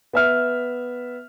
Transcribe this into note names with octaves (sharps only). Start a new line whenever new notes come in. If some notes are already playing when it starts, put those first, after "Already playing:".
B3 E5 F6